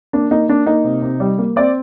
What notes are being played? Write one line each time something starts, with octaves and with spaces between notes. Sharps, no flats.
A#3 D4
A#3 D#4
A#3 D4
A#3 D#4
C3
C3
G3
A#3
C4 D5